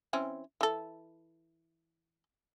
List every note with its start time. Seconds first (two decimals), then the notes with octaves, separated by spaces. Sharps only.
0.13 E3 C4 C#4
0.61 E3 A4